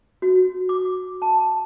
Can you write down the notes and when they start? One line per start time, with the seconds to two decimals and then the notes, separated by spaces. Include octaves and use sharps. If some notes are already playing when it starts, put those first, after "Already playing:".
0.22 F#4
0.69 D6
1.22 A5